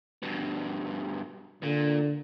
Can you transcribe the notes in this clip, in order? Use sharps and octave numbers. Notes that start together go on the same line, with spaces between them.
G2 B2
A#2 D3